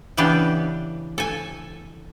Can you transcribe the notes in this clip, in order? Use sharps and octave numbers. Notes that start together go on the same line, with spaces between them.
C#3 E3 B3 D4 G4
A4 G#5